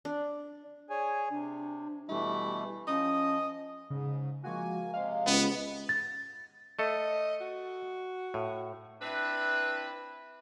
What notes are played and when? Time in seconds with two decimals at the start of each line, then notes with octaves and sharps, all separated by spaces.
0.05 D4
0.90 G#4 C#5 D5 G#5
1.30 C3 D4
2.09 B2 E3 G3 A3 E4
2.87 F3 C#4 D#5
3.90 G#2 C#3
4.44 F3 G#3 A#3 F#4 G#5
4.94 C3 G#3 F5
5.27 C#2 B3
5.89 A6
6.79 A3 A4 D#5
7.41 F#4
8.34 A2
9.01 C4 D4 E4 B4